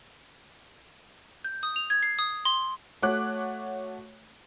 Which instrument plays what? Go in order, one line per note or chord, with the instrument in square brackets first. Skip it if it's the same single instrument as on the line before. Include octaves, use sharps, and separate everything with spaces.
[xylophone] G6
D#6
F7
G#6
C7
D#6
C6
[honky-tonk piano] A3 F#4 C#5 D6 F#6